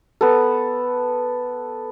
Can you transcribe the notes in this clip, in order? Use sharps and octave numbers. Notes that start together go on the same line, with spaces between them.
B3 A4